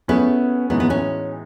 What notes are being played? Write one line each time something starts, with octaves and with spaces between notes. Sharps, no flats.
A3 B3 C#4 E4 G#4
A2 E3 G#3 B3 D#4 F#4
B3
C#4